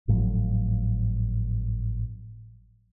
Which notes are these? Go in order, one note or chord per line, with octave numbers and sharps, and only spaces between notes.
G#1 A2 F3 F#3